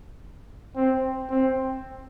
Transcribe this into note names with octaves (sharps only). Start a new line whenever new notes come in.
C4
C4